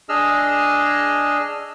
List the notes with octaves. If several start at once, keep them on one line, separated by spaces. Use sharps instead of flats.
D4 G#4 D#5 E6 F6